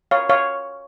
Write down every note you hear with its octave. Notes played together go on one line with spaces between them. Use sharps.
C#5 F5
C#5 F5